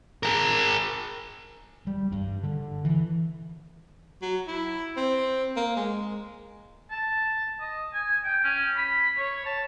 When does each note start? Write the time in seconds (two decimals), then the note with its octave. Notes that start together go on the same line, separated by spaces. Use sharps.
0.23 G#4 A#4
1.87 G3
2.12 G2
2.43 D3
2.85 E3
4.22 F#3
4.47 E4
4.96 C4
5.56 A#3
5.76 G#3
6.91 A5
7.60 D#5
7.94 G#5
8.24 G5
8.44 C#4
8.76 B5
9.17 C#5
9.45 A5